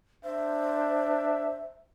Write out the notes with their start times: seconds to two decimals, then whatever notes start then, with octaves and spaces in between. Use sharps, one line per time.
0.25 D4 C5 E5